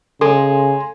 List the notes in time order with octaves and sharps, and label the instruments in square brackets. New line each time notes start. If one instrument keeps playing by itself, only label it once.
[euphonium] C#3 [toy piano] A4 [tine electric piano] G#5 C6